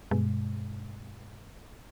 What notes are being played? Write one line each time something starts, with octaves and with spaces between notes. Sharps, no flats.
G2 B2 G#3